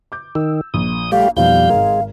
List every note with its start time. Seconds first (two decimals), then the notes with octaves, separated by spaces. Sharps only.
0.12 D6 G6
0.35 D#3 E6
0.74 A#1 D#6
1.12 G3 A3 G4 F5
1.37 F2 B2 F3 G3 D#4 F5 G6
1.70 G#1 G#3 A#4